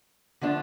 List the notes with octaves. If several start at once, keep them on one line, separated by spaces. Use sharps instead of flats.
D3 F3 A3 D4